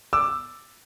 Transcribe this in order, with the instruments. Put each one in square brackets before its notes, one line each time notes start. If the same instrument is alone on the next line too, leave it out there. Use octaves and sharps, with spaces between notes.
[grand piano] D6 E6